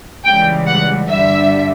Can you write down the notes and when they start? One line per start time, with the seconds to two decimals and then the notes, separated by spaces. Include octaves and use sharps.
0.25 C#2 C#3 E3 G3 G5
0.66 F#5
1.09 G2 D3 G3 E5